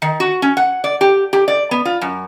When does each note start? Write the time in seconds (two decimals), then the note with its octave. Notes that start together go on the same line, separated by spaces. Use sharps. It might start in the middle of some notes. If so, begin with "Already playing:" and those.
0.02 D#3
0.20 F#4
0.42 C#4
0.57 F#5
0.84 D5
1.01 G4
1.33 G4
1.48 D5
1.71 B3
1.85 F4
2.01 F#2